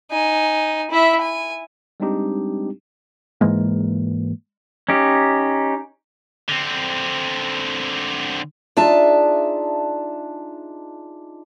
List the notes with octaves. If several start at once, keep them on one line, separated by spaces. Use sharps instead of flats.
D#4 G#5
E4 E5
G#5
G3 G#3 C4 D4 D#4 G4
G#2 E3 G#3 A#3
C#4 D#4 G4
D3 C4
D4 D#4 F4 G#4 E5 A5